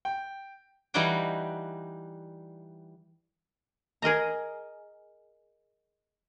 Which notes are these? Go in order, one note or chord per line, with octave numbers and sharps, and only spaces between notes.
G5
E3 G3 D#4 F#4 D5 G5
G#4 A#4 D#5 A#5